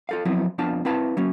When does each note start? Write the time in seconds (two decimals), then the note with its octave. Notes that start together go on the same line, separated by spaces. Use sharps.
0.09 F4 A4 F5
0.25 F3 F#3 B3 C4 E4
0.58 F2 B3 D4 F4 F5 A5
0.85 C4 E4 B4 F5 A5
1.17 F#3 A#3 C#4